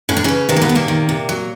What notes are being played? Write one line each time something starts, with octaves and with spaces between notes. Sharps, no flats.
A2 C#4
D4
C#3 E3 C#4
C3 D#3 C4
A#3
B2 B3
C3
A#2 A#3
D#3
C3
F#3